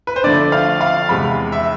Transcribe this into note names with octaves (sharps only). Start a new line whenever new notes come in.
B4
C5
D3 F3 A3 E4 D5
F5
F5
E2 C3 G#3 B5
E5